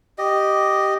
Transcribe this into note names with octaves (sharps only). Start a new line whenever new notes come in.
G4 D#5